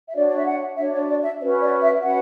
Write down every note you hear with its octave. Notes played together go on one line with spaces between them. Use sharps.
E5
D4 F#4 C#5 D5
D5
E5
F#5
D4 F#4 C#5 E5
C#5
D5
E5
C#4 F#4 B4 C#5
D5
E5
C#4 F#4 B4 F#5